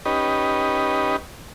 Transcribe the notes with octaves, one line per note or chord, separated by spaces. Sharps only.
C#4 D#4 G4 B4 D#5